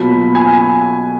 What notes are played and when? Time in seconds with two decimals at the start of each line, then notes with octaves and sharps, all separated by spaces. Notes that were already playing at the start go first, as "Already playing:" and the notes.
Already playing: B2 F#3 A#3 F4 B5
0.35 G#5